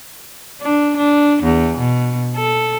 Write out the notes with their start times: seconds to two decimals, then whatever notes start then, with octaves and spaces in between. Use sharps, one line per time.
0.61 D4
0.97 D4
1.43 E2
1.78 B2
2.36 A4